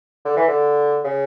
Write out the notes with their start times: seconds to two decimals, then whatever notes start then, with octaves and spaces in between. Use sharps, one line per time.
0.25 D3
0.37 E3
0.48 D3
1.05 C#3